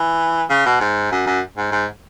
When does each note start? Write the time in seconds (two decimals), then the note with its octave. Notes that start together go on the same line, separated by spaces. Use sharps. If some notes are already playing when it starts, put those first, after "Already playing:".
Already playing: E3
0.50 C#3
0.66 B2
0.80 G#2
1.12 F#2
1.27 F#2
1.57 G#2
1.72 G#2